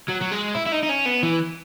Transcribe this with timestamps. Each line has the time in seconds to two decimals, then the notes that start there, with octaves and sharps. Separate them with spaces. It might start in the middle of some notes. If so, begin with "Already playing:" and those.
0.09 F#3
0.22 F#3
0.32 G#3
0.55 E4
0.66 E4
0.72 D#4
0.83 D#4
0.89 C#4
1.05 B3
1.23 E3